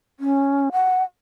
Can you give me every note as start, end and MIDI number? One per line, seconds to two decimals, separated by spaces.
0.20 0.69 61
0.72 1.03 78